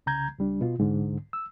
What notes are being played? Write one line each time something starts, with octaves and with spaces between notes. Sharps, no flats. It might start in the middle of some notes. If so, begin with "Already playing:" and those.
C2 C#3 A#5 G6 G#6
C#2 G3 D4
B2 F4
C2 G#2 D3
E6